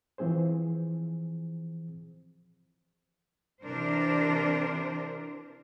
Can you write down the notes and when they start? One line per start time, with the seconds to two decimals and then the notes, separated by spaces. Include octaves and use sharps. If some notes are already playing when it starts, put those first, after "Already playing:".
0.18 E3 F3 C4 G#4 C5
3.63 C3 E3 D4 A#4 C5